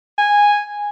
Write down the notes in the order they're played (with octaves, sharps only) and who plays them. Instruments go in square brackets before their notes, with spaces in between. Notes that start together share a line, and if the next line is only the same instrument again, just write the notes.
[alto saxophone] G#5